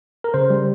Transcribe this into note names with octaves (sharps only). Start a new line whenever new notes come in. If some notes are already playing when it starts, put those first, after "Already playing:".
A#4
C#3 C5
G3